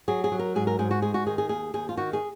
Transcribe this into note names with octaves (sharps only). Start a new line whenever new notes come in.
F#3 G#4
G#4
F#3
A#4
G#2 G#4
A#4
G#2 G#4
F#4
G#3 G#4
F#4
D#3 G#4
G#4
D#2 G#4
D#2 G#4
F4
D#3 F#4
G#4